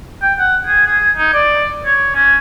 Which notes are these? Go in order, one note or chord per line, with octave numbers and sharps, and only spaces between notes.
G5
F#5
G#4
G#4
D#4
D5
C#5
C#4